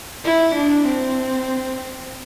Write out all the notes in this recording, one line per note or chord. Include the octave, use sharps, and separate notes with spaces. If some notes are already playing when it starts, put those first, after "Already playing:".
E4
D4
C4